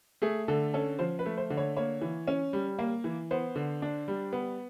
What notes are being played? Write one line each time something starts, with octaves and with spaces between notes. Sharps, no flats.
A3 G#4
D3 A4
C#4 A4
F3 C5
B4
A3
C5
D3
C#5
A#3 C#5
E3
C#4
G3
A#3
E3
B3 C5
D3
D4
G3
B3